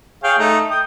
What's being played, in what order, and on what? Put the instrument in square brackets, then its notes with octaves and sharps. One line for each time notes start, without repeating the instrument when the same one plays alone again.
[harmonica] G#4 C#5 F5 [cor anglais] G5
[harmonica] A3 [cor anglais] D#4
[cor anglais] G5 [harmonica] D#6